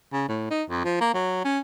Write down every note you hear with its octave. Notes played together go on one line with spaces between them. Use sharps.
C#3
A2
D#4
F2
F3
A#3
F#3
C#4